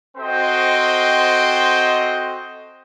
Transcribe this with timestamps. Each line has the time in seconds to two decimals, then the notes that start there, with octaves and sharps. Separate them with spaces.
0.17 C4 F#4 A4 C5 D#5 G5